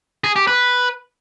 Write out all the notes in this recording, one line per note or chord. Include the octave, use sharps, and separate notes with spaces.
G#4
G4
B4